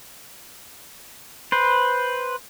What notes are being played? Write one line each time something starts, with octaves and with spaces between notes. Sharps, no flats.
B4 C5